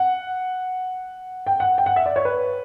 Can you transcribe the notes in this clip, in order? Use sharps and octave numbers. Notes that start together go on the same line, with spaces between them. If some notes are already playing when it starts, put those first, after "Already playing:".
Already playing: F#5
G5
F#5
G5
F#5
E5
D5
C#5
B4